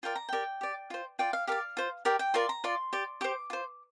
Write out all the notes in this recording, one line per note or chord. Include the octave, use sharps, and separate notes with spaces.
F4 A#4 D5 G5
A#5
G4 A#4 D5 G5
G4 D5
F4 C5
F4 D5 G5
F5
G4 A#4 D5 F5
F4 C5
G4 A#4 D5 G5
G5
F4 A#4 D5 C6
A#5
F4 D5 C6
G4 D5
G4 C5 D6
F4 C5